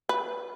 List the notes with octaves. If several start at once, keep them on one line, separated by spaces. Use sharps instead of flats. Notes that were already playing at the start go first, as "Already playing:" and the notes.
B4